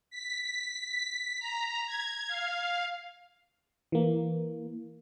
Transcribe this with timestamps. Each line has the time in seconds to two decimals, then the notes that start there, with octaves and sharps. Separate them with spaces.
0.10 B6
1.39 A#5
1.87 G#6
2.28 F5
3.92 E3 A#3